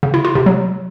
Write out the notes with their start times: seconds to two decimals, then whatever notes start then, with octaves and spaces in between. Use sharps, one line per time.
0.03 C#3
0.14 E4
0.25 F4
0.35 C3
0.46 F#3